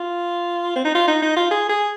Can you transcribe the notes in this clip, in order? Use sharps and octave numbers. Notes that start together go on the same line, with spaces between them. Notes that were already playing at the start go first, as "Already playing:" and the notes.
Already playing: F4
C4
D#4
F4
D#4
D#4
F4
G#4
G#4